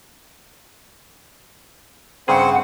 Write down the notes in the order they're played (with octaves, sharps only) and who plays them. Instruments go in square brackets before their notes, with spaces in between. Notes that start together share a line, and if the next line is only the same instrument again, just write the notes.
[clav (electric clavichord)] G2 C#3 G#4 [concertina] C4 C5 [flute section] F#5